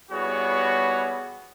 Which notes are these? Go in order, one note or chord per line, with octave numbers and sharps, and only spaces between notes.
G3 B3 E4 F#4 G#4 C#5